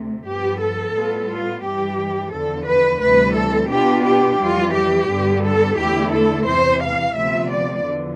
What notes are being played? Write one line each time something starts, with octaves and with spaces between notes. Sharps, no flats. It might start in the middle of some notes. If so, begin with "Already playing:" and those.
Already playing: D2 C3 A3
G2 F3 B3 G4
A4
A2 G3 B3 F4
F4
G2 E3 G3 G4
E2 D3 F3 A4
B4
D2 C3 E3 G3 B4
A4
B2 B3 D4 F4 G4
G4
F2 E3 G3 F4
G4
G2 D3 G3 B3
A4
E2 D3 A3 E4 G4
A4
E2 C3 E3 C5
F5
D2 C3 F3 B3 F4 E5
D5
E2 D3 F3